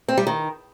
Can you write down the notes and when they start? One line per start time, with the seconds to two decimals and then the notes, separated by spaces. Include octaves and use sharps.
0.08 C4
0.18 G3
0.27 D#3